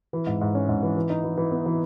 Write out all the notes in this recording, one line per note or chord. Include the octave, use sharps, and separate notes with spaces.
E3
G#2
G#2
C#4
G#2
E3
E3
D#4
E3
E3
B3
E3